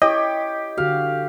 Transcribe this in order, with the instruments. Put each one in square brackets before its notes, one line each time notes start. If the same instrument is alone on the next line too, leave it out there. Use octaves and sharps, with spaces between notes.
[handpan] E4 C#5 [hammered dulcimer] G4 [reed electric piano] D#5
[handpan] D3 F#4 G4 [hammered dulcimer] F5